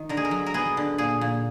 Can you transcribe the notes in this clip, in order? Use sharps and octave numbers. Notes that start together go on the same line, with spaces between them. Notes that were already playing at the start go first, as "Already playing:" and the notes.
Already playing: D#3
D3 A#4
G#4
A#4
F#3
A#4
B3 G#4
D3
A#2 G#4
A#2